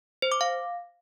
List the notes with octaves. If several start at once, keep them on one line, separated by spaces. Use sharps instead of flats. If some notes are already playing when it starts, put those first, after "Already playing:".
C5
D6
F5